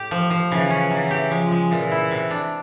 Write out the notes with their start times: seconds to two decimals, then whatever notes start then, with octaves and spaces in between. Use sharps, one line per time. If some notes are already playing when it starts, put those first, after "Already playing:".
Already playing: A2 G4
0.11 F3
0.30 F3
0.51 C#3 E3
0.70 C#4
0.91 E3 F#3
1.11 G4
1.31 F3 G#3
1.52 G#3
1.71 A#2 E3
1.92 E4
2.11 C3
2.31 D4